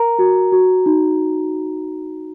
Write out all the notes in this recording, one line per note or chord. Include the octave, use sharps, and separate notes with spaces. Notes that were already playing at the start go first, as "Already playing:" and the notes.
Already playing: A#4 A#5
F#4
F#4
D#4